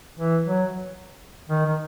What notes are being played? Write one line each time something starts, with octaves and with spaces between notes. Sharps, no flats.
E3
F#3
D#3
D#3